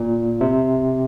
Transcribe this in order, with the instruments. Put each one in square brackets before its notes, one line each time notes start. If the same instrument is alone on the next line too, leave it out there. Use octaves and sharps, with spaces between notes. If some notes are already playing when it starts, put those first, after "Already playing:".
Already playing: [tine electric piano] A#2
C3